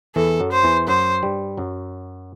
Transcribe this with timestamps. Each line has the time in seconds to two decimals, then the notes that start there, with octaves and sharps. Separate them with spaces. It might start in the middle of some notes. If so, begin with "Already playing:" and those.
0.16 E2 E3 A4
0.40 F#2 F#3
0.52 C5
0.63 E2 E3
0.87 F#2 F#3 C5
1.23 G2 G3
1.58 F#2 F#3